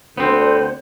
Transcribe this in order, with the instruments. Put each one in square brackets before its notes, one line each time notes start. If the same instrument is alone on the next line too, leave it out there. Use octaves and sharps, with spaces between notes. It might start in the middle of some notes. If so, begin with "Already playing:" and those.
[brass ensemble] D2 D3 [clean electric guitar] B3 C4 [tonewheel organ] C5